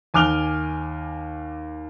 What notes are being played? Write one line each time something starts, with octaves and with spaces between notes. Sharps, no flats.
D#2 G#5 D6 F6 F7 G7